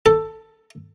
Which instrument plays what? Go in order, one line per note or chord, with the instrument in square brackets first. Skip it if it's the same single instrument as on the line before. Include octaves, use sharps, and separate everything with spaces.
[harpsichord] A4